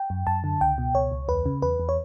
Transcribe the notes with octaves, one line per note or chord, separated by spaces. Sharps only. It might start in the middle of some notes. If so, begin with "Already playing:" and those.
Already playing: G5
F#2
F#2 A5
D3
C#2 G5
B2
C#2 C#5
C#2
E2 B4
C#3
E2 B4
E2
C#5